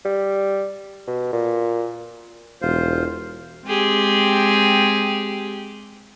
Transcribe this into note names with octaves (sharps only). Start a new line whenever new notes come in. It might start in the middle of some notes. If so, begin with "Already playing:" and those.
G3
B2
A#2
E1 F4 C5
G#3 C4 G4 G#4